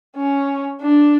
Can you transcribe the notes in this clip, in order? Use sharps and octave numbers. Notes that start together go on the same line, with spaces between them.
C#4
D4